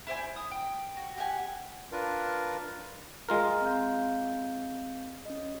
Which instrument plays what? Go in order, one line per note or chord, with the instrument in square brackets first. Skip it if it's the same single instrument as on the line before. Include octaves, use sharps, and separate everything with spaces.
[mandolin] E4 C5 D5 G#5
D#6
G5
F#4
G4 F#5 G#5
[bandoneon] D4 F4 A#4 B4
[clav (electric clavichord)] G#3 F4 A#4
[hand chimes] C4 F5 G6
C#4 D#5